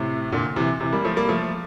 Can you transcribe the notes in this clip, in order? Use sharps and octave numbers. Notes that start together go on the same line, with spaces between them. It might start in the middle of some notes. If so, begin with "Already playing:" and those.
Already playing: A2 C3
A#2 D3
C3 E3
C3 E3
G3 A#3
F3 A3
G3 A#3
F3 A3